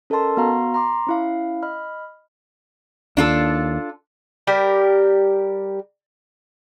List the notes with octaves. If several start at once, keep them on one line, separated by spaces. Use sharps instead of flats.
C#4 A4 A#4 D#5 A5 C6
B3 F#4 F5 A#5 C6
A#5 C6 D6
C#4 E4 F5
D#5 B5 F6
D#2 D4 F4 A4
G3 G4 A#4